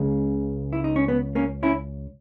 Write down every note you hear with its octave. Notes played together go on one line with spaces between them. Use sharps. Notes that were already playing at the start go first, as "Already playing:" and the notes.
Already playing: C#2 C#3 G#3
E4
D#4
C#4
B3
A#3 C#4
C#4 E4